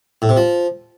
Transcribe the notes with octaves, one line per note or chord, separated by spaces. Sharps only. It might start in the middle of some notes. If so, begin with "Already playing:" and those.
A2
C3
F3